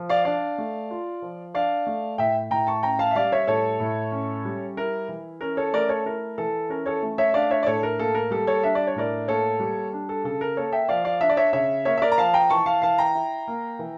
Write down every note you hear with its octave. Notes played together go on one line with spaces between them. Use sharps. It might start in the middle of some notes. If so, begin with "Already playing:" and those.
Already playing: F3
D5 F5
D4 D5 F5
A3
F4
F3
D4 D5 F5
A3
A2 E5 G5
A2 G5 A#5
A5 C#6
C#4 G5 A#5
F5 A5
E5
G3 D5 F5
C#5 E5
A2 A4 C#5
A2
C#4
G3
E4 A#4
E3
C#4 A#4
A4 C#5
A3 A#4 D5
A4 C#5
E4 A#4
E3 A4
C#4 A#4
A4 C#5
A3
C#5 E5
D4 D5 F5
C#5 E5
D5
A2 A4 C#5
A#4
A#3 A4
A#4
G3 A4
A4 C#5
D4 E5
D5
C#5
A2 A#4 D5
A#3 A4 C#5
G3
D4
A4
C#3 A4
A#4
A#3 A4 C#5
E5 G5
F3 D5 F5
D5 F5
D4 E5
D5
C#5 E5
C#3 C#5 E5
A#3 C#5 E5
E5
A#4 D5
A#5
F3 F5 A5
G5 A#5
E3 A5 C#6
F5 A5
E3 F5 A5
G5 A#5
E4
A#3
E3